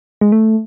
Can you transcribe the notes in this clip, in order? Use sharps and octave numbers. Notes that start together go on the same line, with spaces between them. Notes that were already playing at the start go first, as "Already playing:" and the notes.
G#3
A3